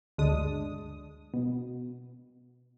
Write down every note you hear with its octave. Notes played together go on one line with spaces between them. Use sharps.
G1 D2 G#3 D4 D#6
B2